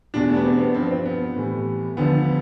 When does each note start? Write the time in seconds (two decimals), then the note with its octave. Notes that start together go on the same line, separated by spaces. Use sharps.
0.14 E2 B2 G3 D4
0.29 A3
0.36 B3
0.45 C4
0.59 B3
0.75 G2 F3 C4
0.91 C4
1.06 B3
1.36 A2 E3 G3
1.97 D2 D3 F3 B3